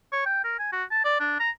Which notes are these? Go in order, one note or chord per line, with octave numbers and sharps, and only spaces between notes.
C#5
G5
A#4
G#5
F#4
A5
D5
D4
A#5